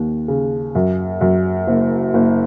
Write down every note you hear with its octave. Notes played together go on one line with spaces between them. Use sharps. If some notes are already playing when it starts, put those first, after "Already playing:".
Already playing: D#2
C#3
F#2
F#2
F#1
F#1